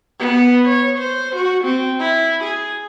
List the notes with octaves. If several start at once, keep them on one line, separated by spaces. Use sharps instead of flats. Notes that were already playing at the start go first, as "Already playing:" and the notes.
B3
C#5
C5
F#4
C4
E4
G#4